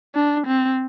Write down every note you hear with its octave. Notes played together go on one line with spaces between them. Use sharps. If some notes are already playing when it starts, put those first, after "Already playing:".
D4
C4